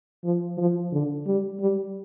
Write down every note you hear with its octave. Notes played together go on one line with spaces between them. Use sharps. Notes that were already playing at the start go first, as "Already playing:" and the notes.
F3
F3
D3
G3
G3